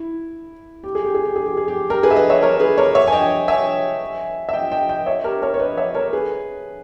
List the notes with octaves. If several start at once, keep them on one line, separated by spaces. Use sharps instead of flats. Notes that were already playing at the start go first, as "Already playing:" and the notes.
Already playing: E4
G4
G#4
G4
G#4
G4
G#4
G4
G#4
G4
G4 A#4
G#4 B4
E5
B4 D#5
C#5 E5
A#4 C#5
G#4 B4
A#4 C#5
C#5 E5
G#5
D#5 G5
E5 G#5
E5
D#5 G5
D#5 G5
D#5 G5
C#5 E5
G4 A#4
A#4 C#5
C#5
B4 D#5
C#5 E5
A#4 C#5
G#4 B4